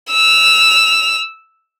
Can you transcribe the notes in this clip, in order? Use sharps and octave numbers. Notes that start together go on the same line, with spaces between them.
E6 F7